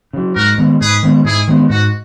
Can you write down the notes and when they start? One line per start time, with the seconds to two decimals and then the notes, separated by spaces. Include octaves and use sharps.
0.13 C#3 F#3
0.36 G#2 F#4 A#4
0.58 D#3 G#3 B3
0.80 G#2 G#4 B4
1.03 D#3 G#3 B3
1.24 G#2 E4 G#4
1.48 D#3 G#3 B3
1.69 G#2 F#4